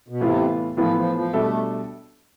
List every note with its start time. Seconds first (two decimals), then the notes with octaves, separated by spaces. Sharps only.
0.08 B2
0.20 A2 C3 E3 B3 F4
0.77 A2 E3 F3 B3 F4
0.96 F3
1.15 F3
1.33 B2 G3 A3 D4 A4 E5